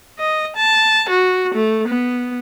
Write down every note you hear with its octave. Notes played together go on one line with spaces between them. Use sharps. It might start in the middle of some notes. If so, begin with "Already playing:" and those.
D#5
A5
F#4
A3
B3